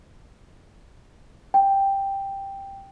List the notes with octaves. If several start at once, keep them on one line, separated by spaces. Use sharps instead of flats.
G5